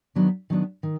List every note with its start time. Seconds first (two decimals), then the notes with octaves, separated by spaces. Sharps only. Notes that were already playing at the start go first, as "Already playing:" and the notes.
0.15 D#3 F#3 B3 D4
0.50 D#3 F#3 B3 D4
0.83 D#3